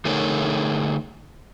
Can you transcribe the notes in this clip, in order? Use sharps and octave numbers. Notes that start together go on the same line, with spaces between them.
D3 A3 D#4 G#4 A#4 C#5